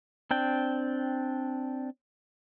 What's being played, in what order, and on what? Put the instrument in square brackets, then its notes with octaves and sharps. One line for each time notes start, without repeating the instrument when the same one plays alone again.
[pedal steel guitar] C4 D4 G5